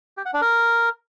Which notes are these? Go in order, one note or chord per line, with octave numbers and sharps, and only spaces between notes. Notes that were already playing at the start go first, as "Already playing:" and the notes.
G4
F#5
D4
A#4